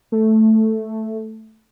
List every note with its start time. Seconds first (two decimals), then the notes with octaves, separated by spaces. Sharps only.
0.12 A3